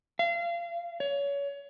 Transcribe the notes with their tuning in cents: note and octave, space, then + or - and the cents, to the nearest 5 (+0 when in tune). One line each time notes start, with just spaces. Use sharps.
F5 -30
C#5 +25